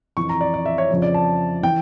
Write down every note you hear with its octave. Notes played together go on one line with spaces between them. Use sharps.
F2 E3 C#6
A#5
D5
D5
E5
C#5
F2 C#3 F3
D5
A5
E3 G5